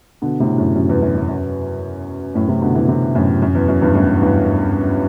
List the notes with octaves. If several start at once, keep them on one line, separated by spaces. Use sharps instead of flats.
B2 D3
A2 C3
F#2 A2
F#2
E2
F#2
F#2
F#2
F#2 A2
A2 C3
B2 D3
C3 E3
C3 E3
F#2 A2
F#2
E2
F#2
E2 G2
F#2 A2
E2 G2